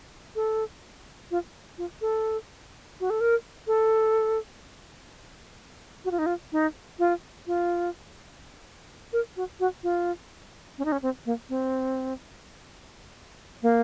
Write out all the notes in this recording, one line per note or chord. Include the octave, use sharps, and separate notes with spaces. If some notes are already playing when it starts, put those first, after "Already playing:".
A4
F4
F4
A4
F#4
A4
A#4
A4
F#4
F4
D#4
F4
D#4
F4
F4
A#4
F#4
F#4
F4
C#4
D#4
C#4
C4
A#3
C4
A#3